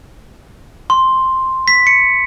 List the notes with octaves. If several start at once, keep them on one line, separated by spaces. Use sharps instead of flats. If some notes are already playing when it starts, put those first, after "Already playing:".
C6
B6
C#7